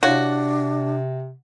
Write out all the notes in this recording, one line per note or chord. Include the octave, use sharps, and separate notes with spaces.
C3 D4 E4 F#4 C#5 F5